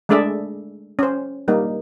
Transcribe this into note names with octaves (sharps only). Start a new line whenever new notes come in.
G#3 A3 D4 G#4 D5 E5
C#4 C5
G3 A#3 D#4